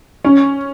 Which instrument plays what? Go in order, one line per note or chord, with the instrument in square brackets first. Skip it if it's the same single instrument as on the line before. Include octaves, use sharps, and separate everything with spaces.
[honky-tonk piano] C#4